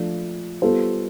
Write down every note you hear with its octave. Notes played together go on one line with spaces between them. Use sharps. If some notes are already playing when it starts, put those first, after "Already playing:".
Already playing: F3 A3 D4
G3 B3 F4 A4 C5